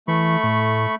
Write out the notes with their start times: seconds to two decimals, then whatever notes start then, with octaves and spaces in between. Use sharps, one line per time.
0.08 E3 A3 B5 C#6
0.44 A2